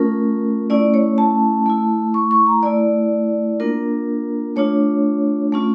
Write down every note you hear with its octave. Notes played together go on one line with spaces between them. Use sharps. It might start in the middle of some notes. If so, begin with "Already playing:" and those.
Already playing: A3 C#4 F4 A#4
A3 C#4 E4 D5
C#5
A5
A3 E4
C#6
C#6
A#5
A3 E4 D5
A#3 D4 F4 A#4
A3 D4 F4 C#5
A3 C#4 F4